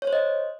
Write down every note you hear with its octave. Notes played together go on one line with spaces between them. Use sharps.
C#5
C5
D#5